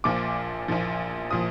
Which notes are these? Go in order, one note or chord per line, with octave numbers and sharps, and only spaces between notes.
A#1 A#2 F3 D6
A#1 A#2 F3
A#2 F3 D#6